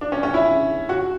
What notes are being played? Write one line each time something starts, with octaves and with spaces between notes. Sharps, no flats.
D4
C#4
C#4
E4
F#4